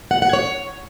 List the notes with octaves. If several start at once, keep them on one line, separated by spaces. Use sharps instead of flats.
F#5
F#5
C#5